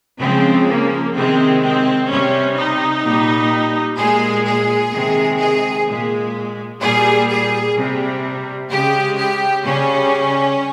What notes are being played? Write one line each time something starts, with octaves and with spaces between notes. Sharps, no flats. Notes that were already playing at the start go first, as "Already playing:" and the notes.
C#3 F3 G#3 C4
A#3
C3 D#3 G#3 C4
C4
C3 G3 C#4
D#4
A#2 G3
A#2 G#3 G#4
G#4
C3 D#3 G#3
G#4
A#2 G#3
A#2 G3 G#4
G#4
C3 G3
C#3 G#3 G4
G4
C#3 G3 C#4